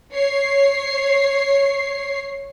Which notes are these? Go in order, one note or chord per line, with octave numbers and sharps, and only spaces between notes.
C#5 C7